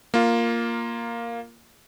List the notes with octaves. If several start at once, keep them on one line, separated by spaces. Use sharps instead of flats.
A#3 F4